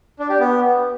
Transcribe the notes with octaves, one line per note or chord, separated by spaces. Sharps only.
D4
G4
B3